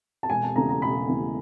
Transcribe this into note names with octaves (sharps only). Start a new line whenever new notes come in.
A5
E1 G#5
A5
E2 C#3 E3 A3 A#5
A#5
E1 B5
E2 C#3 E3 A3